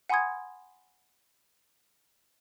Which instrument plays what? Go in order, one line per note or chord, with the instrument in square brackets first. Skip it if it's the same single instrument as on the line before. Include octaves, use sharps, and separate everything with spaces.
[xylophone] F#5 G#5 B5 C6 D#6 G#6